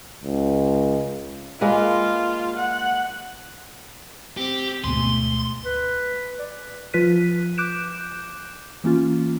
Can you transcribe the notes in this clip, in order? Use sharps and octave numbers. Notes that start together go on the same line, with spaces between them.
C#2
G#3 A#3 F4 B4
F#5
C4 G4
D2 G#2 B2 A3 G#4 C6
B4
D5
F3 F4 B4 F#6 B6 D#7
D6 F#6 G6 D7 E7
E3 A#3 C#4 F4